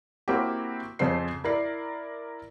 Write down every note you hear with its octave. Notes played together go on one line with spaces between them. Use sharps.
A#3 C4 E4 F#4 G4
F2 C#3 C4 C5 C7
E4 A#4 D5 C7